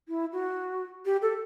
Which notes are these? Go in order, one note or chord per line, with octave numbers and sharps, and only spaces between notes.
E4
F#4
G4
A4